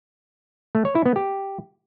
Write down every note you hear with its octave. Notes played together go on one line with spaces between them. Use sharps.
A3
C#5
E4
B3
G4